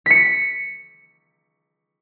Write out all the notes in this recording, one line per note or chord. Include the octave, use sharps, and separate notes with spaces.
B6 C#7